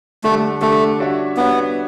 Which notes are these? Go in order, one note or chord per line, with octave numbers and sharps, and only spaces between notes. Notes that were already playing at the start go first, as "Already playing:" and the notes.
D3 G3 A3 D4 A4
D3 G3 A3 D4 A4
G3 D4 F#4 C#5 E5
G3 B3 D4 F#4 C#5 E5